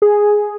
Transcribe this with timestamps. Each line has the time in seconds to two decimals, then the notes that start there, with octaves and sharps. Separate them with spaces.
0.02 G#4